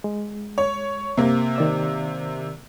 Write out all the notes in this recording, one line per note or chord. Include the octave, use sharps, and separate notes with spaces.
G#3
C#5
C3 A#3
D#3 D5 E6